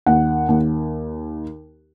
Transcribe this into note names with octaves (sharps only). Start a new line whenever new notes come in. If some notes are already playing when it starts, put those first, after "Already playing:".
D#2 F#5
D#2